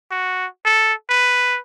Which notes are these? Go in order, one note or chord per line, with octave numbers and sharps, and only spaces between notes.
F#4
A4
B4